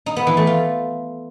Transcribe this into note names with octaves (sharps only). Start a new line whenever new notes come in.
D#4
B3
E3
A3
F4